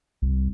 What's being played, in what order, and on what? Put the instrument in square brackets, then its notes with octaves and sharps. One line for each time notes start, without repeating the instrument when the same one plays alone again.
[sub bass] C2